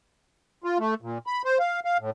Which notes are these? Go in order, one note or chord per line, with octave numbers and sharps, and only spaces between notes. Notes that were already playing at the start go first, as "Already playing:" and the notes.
F4
A3
A#2
B5
C5
F5
F5
A2